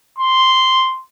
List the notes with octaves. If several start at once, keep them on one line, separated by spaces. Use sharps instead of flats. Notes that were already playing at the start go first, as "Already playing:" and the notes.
C6